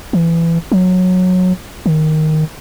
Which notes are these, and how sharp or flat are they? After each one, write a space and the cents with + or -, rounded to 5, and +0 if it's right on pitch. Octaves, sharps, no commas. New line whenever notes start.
E3 +20
F#3 -15
D#3 +0